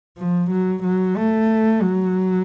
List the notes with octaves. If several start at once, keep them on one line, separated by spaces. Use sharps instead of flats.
F3
F#3
F#3
A3
F#3